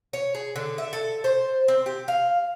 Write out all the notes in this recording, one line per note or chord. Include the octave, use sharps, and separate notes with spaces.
C#5
G#4
D3
E5
A4
C5
C4
G4
F5